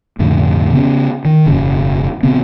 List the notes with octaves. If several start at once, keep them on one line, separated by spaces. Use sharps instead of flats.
B1 F2 A2 D3
C#3 B3 C#4
D#3
E1 F#2 C#3
A#1 C#3 B3 C4